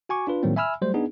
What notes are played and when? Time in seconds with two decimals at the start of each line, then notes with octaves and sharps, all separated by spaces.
0.09 F#4 G#5 C#6 D6
0.27 D4 F4 B4
0.43 A2 D#3 F#3 G3 A#3 C4
0.56 E5 G#5 B5 E6 F6
0.82 F#3 G3 A3 C5
0.94 B3 D4 D#4 G#4